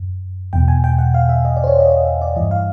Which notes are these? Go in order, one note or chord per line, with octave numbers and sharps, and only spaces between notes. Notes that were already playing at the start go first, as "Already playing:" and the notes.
Already playing: F#2
E2 B2 G5
G#5
G5
F#5
F5
E5
D#5
D5
C5
C#5
D#5
D#5
E5
D5
G2 E3 D#5
F5